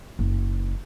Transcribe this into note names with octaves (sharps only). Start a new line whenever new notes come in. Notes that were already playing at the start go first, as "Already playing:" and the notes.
F#1